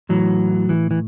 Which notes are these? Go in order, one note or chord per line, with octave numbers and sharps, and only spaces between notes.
A2 E3 F#3
E3
E3